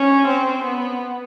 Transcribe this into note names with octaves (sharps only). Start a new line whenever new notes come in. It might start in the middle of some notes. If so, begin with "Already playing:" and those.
Already playing: C#4
C4
B3